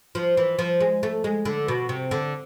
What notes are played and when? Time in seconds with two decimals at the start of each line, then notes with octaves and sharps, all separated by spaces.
0.15 F3
0.37 E3
0.59 F3
0.80 G#3
1.03 A3
1.24 G#3
1.45 D3
1.68 B2
1.89 C3
2.11 D3